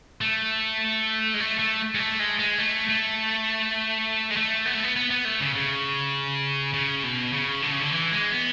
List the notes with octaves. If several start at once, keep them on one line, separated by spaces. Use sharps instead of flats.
A3
G#3
A3
A3
G#3
A3
G#3
G#3
A3
A3
G#3
A3
B3
A3
B3
B3
B3
A3
C#3
C#3
C#3
B2
C#3
D3
C#3
D3
E3
G#3
B3